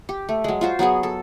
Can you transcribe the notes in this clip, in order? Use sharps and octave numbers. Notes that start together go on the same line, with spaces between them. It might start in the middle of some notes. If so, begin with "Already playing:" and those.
G4
A3
F#3 G#3
F4 F#4 C5
F#3 B3 F#4 G#4
A4